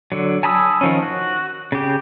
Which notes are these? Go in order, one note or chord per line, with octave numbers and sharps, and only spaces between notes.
D3 F#3
G#5 A5 B5 D#6 E6
D#3 F3 C#4
F#4
C#3 G4